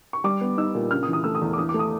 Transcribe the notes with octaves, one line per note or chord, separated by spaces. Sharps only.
C#6
G3 D6
B3
D#4 E6
A#2
C#3 F6
D#6
E3
D#6
A3 E6
D#6
E2
D6
E3 D#6
D6
A3
D#6